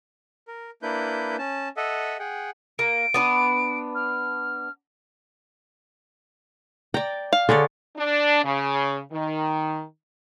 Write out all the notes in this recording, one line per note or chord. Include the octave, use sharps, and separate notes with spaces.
A#4
A#3 D4 E4 B4 G6
C#4 A5
A4 D#5 E5 F#5
G#4 F#5 G5
A#3 D7
B3 D4 B4
F6
D5 G5 A#5
F5
D3 G#4 C#5 D5
D4
C#3
D#3